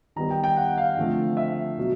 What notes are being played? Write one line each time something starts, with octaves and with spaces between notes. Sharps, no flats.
D#3 G3 B3 A#5
G5
G5
F#5
F5
D3 F3 A3 C4
E5
B2 F#3